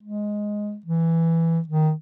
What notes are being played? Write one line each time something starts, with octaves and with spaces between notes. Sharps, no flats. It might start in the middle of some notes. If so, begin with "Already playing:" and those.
G#3
E3
D#3